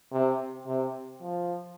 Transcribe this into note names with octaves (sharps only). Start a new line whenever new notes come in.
C3
C3
F3